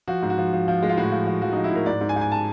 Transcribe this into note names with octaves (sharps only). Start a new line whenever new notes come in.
F3 F#4
G#2
F#4
F3
F3
F3
G#3
F4
A2 F#4
F3
F3
F3 F#4
D#4
F3
E4
A2 A#4
G#2 D5
G#2
G#5
G#2
G#5
A5